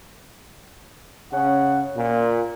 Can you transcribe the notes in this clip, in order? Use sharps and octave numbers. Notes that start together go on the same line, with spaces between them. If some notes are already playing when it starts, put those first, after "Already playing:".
C#3 C#4 F#5
A#2